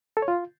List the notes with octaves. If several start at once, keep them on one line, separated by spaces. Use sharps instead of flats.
A4
C#5
F4